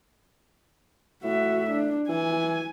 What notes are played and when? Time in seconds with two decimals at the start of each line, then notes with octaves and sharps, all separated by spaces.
1.24 A2 F#4 E5
1.70 D4
2.09 E3 G#5